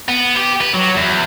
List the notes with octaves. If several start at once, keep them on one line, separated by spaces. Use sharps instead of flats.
B3
G4
B4
F#3
E2